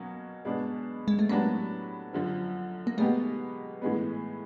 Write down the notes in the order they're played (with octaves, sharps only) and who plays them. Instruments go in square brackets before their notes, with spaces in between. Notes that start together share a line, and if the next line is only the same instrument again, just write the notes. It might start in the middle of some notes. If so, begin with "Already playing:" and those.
Already playing: [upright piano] B2 F#3 A#3 C#4 F#4
B2 G#3 B3 D4
[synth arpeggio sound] G#3
A3
[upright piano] A2 F#3 B3 D4 G4 [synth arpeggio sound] A#3
[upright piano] F#2 D3 F3
[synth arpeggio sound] A#3
[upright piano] B2 G#3 B3 D#4 G4 [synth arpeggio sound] A3
[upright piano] A2 E3 G#3 B3